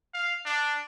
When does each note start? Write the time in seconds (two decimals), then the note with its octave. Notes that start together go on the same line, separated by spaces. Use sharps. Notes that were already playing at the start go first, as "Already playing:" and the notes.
0.14 F5
0.45 D4